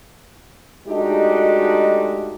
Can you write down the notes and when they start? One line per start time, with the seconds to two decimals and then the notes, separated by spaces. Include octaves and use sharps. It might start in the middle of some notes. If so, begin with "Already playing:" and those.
0.87 G#3 A3 D4 D#4 F#4 G4